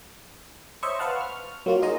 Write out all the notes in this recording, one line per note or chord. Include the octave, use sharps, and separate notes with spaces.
C5 C#5 D#5 E5 C6 C#6
B4 C5 F5 F#5 A5
C#6 F6
F#3 A#3 F4 F#4
D#4 F4 G#4 D#5